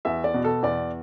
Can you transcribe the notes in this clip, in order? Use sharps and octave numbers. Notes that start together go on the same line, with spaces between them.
E2 E5
D5
B2
A4
E2 D5